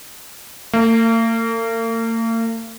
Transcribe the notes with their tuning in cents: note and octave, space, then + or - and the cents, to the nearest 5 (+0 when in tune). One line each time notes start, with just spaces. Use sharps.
A#3 -45